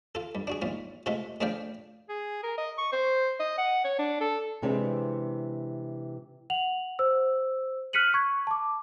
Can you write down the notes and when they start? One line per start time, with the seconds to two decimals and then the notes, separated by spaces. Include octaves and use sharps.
0.15 F4 A4
0.35 G2
0.47 D4 F#4 G#4
0.62 A#1 G#2 F4
1.06 C3 G#3 A3 F4 A4
1.41 A2 F3 D4 G#4 F5 G5
2.09 G#4
2.43 A#4
2.58 D#5
2.78 C#6
2.92 C5
3.40 D#5
3.58 F#5
3.85 C#5
3.99 D4
4.21 A4
4.62 C3 E3 G#3 C4 D4
6.50 F#5 F7 F#7
6.99 C5 E6
7.93 F6 F#6 B6 C#7 D#7 F#7
8.14 C#6 G#6
8.47 A5 D6